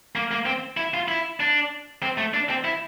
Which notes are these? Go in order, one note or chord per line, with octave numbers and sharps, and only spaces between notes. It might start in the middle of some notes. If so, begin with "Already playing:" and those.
A#3
A#3
C4
E4
F4
E4
D4
C4
A3
D4
C4
E4